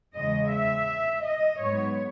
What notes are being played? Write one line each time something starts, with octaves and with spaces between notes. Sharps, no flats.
E2 C#3 G#3 D#5
E5
D#5
G#2 F#3 B3 C#5